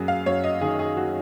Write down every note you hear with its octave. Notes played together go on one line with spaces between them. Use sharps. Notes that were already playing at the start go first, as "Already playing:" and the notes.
Already playing: F#2 F#3 F#4 G#4
F5
F#2 C#5
D#5
D#3 G#4
G#4
F#3 F#4